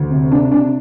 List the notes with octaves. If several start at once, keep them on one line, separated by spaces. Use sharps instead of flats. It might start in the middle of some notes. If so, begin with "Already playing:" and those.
Already playing: D2
C3
C3 D4
C3 D4